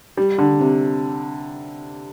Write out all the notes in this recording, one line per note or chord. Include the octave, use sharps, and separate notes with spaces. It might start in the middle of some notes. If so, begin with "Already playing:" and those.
G3
D3
C3